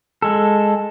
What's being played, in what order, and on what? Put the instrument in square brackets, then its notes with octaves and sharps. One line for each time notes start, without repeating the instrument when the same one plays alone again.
[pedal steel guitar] G#3 A4